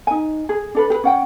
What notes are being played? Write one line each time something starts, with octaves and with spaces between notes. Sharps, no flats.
D#4 G#5
G#4
D4 A4 B4
G4 B4
C#4 F#5 G5